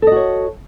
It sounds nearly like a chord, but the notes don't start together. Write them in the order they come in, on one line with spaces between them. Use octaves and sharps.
A4 D#5 F#4 C#5